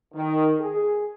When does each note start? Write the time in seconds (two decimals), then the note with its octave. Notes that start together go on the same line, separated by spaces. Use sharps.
0.14 D#3
0.59 G#4